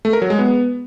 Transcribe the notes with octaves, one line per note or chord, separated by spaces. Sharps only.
A3
A#4
F#3
G#3
B3